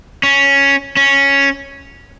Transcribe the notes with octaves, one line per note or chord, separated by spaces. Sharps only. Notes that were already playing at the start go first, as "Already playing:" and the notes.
C#4
C#4